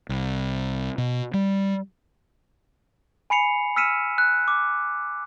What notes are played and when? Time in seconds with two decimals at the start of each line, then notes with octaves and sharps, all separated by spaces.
0.09 C2
0.98 B2
1.34 G3
3.30 G#5 B5 C7 C#7 F7
3.76 E6 F6 B6 C#7 D#7 E7
4.18 F#6
4.48 D6